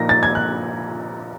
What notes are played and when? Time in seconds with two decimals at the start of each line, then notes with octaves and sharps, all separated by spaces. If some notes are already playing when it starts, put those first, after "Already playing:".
Already playing: A#2 F3 A#3 D#4 A#6
0.09 A6
0.23 G#6
0.35 F#6